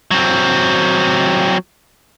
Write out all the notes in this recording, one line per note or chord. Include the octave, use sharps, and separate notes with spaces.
F#3 C4